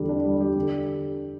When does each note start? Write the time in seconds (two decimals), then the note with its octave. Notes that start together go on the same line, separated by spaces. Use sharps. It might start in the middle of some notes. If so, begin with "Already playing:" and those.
Already playing: E2 D3 G3 G4
0.09 D4
0.25 G3
0.41 G4
0.56 D3